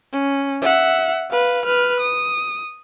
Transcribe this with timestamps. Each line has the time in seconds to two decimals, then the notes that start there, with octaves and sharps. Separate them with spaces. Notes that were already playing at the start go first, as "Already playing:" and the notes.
0.13 C#4
0.62 E5 F#5
1.30 B4 F5
1.66 B4 F6
2.00 D#6